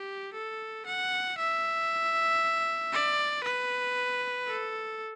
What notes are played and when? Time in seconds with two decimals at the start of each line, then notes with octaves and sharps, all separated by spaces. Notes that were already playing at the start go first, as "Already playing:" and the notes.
Already playing: G4
0.33 A4
0.86 F#5
1.38 E5
2.92 D5
3.44 B4
4.47 A4